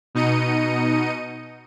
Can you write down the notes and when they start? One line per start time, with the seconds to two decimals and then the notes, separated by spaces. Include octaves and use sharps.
0.15 B2 D#4 D#5 C#7 D#7